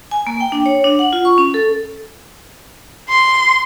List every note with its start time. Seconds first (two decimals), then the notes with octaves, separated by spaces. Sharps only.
0.11 G#5
0.27 A#3
0.41 G5
0.52 D4
0.66 C#5
0.84 D4
0.99 F#5
1.13 F4
1.25 C#6
1.38 C#4
1.54 A4
3.09 C6